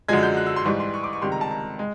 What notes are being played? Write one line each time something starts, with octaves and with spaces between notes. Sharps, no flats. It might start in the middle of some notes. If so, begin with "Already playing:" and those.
F#2 D3 F3 G#3 G#6
G6
F#6
E6
C6
G#2 E3 G3 C#6
C6
C#6
D6
C#6
C#2 C3 D#3 G3 C6
A#5
A5
A#5
G#3